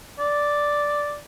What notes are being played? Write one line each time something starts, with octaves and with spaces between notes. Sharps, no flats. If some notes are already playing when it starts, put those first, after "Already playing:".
D5